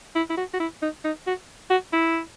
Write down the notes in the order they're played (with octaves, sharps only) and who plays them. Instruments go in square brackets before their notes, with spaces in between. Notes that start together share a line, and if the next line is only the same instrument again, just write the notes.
[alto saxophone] E4
E4
F#4
F#4
E4
D#4
D#4
F#4
F#4
E4